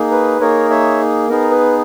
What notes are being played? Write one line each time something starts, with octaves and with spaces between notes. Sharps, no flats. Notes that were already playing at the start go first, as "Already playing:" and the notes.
Already playing: A#3 D#4 G#4
B4
A#3 D#4 G#4 A#4 C#5
C#5 E5
B3 D#4 G#4 A#4
B4